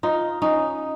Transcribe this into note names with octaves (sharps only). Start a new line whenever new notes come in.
D#4 F4
C#4 D#4